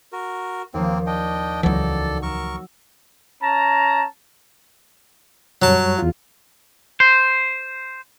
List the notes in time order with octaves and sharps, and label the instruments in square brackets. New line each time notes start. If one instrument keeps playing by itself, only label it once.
[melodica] F#4 A#4
[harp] D#2 F3 [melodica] A#3 C4
[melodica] D4 D#5 G5
[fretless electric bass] C#2 E3 [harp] F#3 D#4 [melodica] A4 D5
[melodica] A#4 C#6 [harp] E6
[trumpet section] C#4 A5 A#5
[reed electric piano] F#2 G3 C#5 [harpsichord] F#3 A5
[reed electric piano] E2 F4
[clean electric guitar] C5